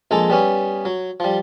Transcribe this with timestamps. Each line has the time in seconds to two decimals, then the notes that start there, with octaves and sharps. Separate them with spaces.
0.11 A#1 G#3 A4 A#5
0.30 G3 B3 C#4
0.85 F#3
1.20 F3 G3